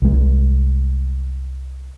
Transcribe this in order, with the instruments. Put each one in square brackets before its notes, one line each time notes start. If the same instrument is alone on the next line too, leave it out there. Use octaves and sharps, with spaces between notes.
[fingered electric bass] C2 G#3